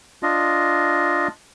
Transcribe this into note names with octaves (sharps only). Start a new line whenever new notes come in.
D4 F4 D#5